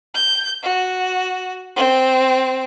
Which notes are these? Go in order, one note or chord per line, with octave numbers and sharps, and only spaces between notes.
G6
F#4
C4